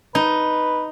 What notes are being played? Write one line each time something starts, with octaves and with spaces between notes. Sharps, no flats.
D#4 B4